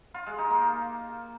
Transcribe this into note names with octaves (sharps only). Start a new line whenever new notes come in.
F4
G#3
D#4
A#3